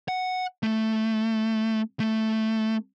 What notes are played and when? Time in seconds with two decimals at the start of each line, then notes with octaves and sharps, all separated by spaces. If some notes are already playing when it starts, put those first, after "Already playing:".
0.08 F#5
0.63 A3
2.00 A3